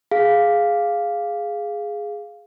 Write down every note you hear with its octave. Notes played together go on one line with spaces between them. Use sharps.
G#4 F5